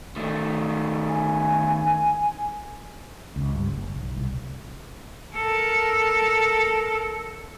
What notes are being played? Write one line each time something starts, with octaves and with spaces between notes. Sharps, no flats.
D#3 A3
G#5
C#2
G2
F#1
B1
C2
A4 A#4